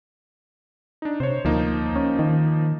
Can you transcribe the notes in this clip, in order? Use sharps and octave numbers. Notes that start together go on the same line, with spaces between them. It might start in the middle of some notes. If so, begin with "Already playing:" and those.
D4 D#4
C3 C5 C#5
D2 F3 A#3 D#4
C#4
D#3